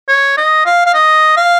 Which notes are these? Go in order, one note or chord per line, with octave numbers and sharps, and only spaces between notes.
C#5
D#5
F5
F5
D#5
F5